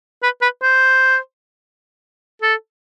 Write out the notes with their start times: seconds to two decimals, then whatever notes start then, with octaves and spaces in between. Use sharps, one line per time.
0.23 B4
0.42 B4
0.63 C5
2.42 A4